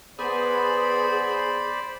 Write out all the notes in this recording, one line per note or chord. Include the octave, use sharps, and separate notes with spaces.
B3 G#4 C5 D5 B5